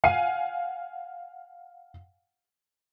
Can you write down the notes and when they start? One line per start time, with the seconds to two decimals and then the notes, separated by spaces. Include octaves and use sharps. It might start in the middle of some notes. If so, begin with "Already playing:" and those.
0.04 F5 F#5 G#5 C7 D#7